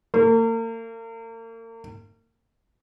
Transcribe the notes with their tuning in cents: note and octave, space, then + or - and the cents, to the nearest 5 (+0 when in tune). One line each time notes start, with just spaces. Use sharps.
A#3 -40